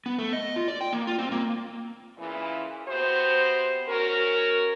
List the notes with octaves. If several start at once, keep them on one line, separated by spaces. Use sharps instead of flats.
B3
A3
D#5
F4
D5
G5
A#3
F4
C4
A#3
A#2 C#3 E3
C3 B3 F#4 C5
C#4 F#4 A#4